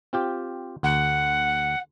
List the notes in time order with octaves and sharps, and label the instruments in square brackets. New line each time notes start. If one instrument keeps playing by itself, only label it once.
[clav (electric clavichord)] C4 F4 G4
[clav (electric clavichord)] D2 [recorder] F#5